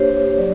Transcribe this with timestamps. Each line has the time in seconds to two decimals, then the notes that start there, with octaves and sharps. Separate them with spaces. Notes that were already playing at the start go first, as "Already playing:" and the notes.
Already playing: A#3 D4 G4 C5 C#5
0.38 F#3 D5